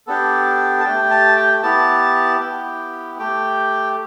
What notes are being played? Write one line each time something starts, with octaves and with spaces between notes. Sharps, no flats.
B3 D4 G4 A4
A5
A3 G4 G5
A5
G5
B3 E4 G4 A5
B3 E4 G4 G5
A3 G4 G5